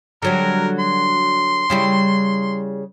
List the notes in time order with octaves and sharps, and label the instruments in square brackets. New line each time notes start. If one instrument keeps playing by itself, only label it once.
[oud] D3 F#3 G3 [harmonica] A#4
[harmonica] C6
[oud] C#3 G3 E4